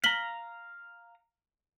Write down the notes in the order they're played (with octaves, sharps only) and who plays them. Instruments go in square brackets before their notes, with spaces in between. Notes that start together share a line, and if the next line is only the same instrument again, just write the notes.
[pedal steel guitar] F5 A#5 [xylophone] B6 F#7 G7